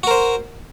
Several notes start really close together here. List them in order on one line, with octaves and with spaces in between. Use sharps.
F#4 A#4 C5